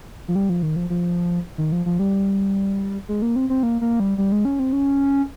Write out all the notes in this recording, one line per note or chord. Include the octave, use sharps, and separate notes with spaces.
F3
G3
F3
D#3
F3
F3
D#3
F3
F3
G3
G#3
A#3
C4
C4
A#3
A#3
G3
G3
G#3
C#4
C4
C#4